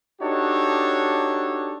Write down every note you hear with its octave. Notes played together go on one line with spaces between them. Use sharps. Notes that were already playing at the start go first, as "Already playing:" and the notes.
D4 D#4 F#4 G4 A4 C#5